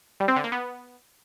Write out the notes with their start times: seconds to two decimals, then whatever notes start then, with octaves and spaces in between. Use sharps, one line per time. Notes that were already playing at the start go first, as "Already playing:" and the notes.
0.20 G3
0.28 C4
0.36 D3
0.44 A#3
0.52 B3